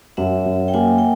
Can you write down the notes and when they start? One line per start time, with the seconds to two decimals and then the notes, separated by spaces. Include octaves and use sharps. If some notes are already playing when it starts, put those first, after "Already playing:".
0.17 F#2 E5 F#5
0.46 F#2
0.68 G5
0.74 A#3 F#5 G#5
0.98 G5